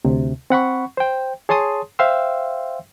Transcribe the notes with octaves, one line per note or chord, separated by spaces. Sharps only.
D2 C3
C4 F#5 B5 C#6
C5 G5
G#4 C#5 A5 C6 D#6
C5 E5 F5 G5 C6 E6